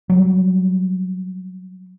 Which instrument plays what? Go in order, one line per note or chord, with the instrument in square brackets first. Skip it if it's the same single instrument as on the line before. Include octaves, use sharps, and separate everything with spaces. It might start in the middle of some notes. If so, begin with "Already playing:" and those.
[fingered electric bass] F#3 G3